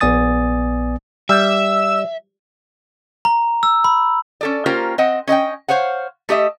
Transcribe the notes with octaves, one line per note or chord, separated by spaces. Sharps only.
A#1 B3 D5 G#5 D#6 A6
G3 E5 E6
A#5
E6
B5
C#4 A4 D5
A#3 C#4 F4 G4 A#4 C5
C4 D#5 F#5
C#4 D#5 F#5 G5
C5 C#5 F5 F#5
A3 G4 D#5 E5